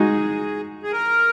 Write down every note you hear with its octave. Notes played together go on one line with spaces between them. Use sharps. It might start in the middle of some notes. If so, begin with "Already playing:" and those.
Already playing: G#3 D#4 F#4 G#4
G#4
A#4